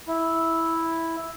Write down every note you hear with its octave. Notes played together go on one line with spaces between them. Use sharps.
E4